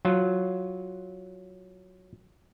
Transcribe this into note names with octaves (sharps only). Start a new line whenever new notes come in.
F#3 F4